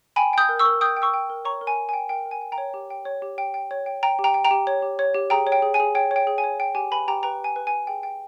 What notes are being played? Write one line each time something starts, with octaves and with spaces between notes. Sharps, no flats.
G5 G#5 B5
G5 D#6 G6
A#4
C#6 E6
A#4
G5 D#6 G6
G5
C#6 E6
G5
A#4
C#5 A#5 C#6
A#4
G#5 B5
A#4
G#5
G5
A#4 G5
A#4
G#5
G5
G5 A#5
C#5
G4
G5
C#5
G4
G5
G5
C#5
G5
G5 A#5
G4
G5 A#5
G5
G5 A#5
G4
C#5
G4
C#5
G4
G#4 G5 A#5
C#5
G5
G#4
G#5
G#4
C#5 G5
C#5 G5
G#4
G#5
C#5
G5
G4 G#5
B4 G#5 B5
G4 G5 A#5
B4 G5 A#5
G4 G#5
B4
G#5
B4
G#4 G5
G5